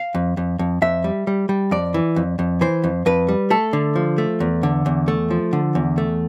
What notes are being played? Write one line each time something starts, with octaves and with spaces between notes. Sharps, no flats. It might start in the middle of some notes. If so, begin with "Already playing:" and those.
Already playing: F5
F2
F2
F2
F2 E5
G3
G3
G3
F2 D5
E3
F2
F2
E3 C5
F2
F2 B4
G3
A3 A4
D3
F3
A3
E2
D3
E2
A3
F3
D3
E2
A3